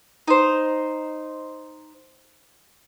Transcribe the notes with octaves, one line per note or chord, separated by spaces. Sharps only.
D#4 C5